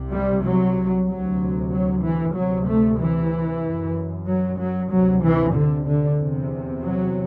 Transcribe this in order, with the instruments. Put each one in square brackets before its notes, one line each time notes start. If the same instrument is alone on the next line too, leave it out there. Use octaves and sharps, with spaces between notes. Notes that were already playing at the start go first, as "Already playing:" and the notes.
Already playing: [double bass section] C2 C3
G3
F#3
D2 C3 F#3
F#3
E3
D2 C3 F#3
A3
E3
F#2
F#3
F#3
D2 C3 F#3
E3
D3
D3
E2 C3
F#3